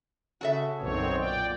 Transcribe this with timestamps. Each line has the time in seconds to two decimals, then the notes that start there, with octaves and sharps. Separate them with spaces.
0.41 C#3 F#4 A4 E5
0.80 B1 F#2 D#3 C4 C#5
1.18 A#2 D5 G5